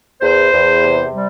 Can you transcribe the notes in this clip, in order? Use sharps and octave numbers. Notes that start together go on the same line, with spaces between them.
E2 C5
E2
C3
G3